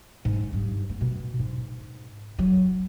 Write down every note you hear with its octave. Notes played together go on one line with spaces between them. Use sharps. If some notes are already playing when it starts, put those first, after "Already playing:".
G#2
G2
B3
B2
G#2
F#3